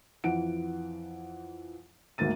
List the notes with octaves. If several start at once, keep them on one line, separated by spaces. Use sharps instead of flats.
F2 E3 F#5 D7
D2 G#2 A#3 A6 D#7